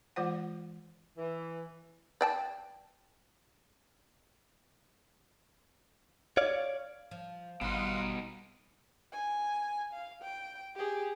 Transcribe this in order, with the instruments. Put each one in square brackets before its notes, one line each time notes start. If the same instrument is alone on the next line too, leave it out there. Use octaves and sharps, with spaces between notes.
[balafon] E3 G#3 F4 C5 F#5
[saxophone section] E3
[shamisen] D5 G5 A5
[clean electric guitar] C#5 D5 F5
[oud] F3
[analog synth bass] G#1 [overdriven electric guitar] B2 D#4 [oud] G3 [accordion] F5 F#5 C6
[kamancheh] G#5
F5
G5
G4 G#4